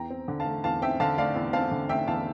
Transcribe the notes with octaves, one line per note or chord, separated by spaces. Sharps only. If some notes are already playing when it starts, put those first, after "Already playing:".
Already playing: E2 G5 A#5
C4
D3
F5 A5
A3
E2 F5 A5
C4 E5 G5
D3 F5 A5
A3 D5 F5
E2
C4 F5 A5
D3
A3 E5 G5
E2 F5 A5